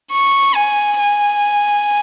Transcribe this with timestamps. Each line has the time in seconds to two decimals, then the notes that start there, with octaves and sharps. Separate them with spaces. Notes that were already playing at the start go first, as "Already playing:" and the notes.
0.12 C#6
0.55 G#5
0.98 G#5